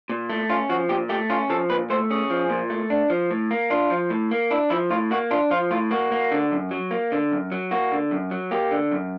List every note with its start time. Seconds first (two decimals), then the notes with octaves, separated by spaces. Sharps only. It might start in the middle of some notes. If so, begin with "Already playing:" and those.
0.09 A#2
0.30 A3
0.50 C#4 F4
0.69 F3 F#4
0.89 A#2 G4
1.09 A3 G4
1.30 C#4 F4
1.50 F3 A4
1.70 A#2 B4
1.90 A3 C5
2.10 C#4 G#4
2.30 F3
2.50 A#2
2.70 A3
2.90 D4
3.10 F3
3.31 A2
3.51 A#3
3.70 D4 F4
3.90 F3
4.10 A2
4.31 A#3
4.51 D4 E4
4.70 F3 E4
4.91 A2 F4
5.11 A#3 F#4
5.31 D4 F4
5.51 F3 F4
5.71 A2 F4
5.91 A#3 F#4
6.12 A#3
6.32 D3
6.51 F#2
6.71 F#3
6.91 A#3
7.12 D3
7.32 F#2
7.52 F#3
7.71 A#3 F#4
7.92 D3
8.11 F#2
8.31 F#3
8.51 A#3 G4
8.71 D3
8.91 F#2